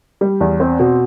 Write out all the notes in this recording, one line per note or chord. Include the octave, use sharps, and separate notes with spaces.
G3
E2
C4
B2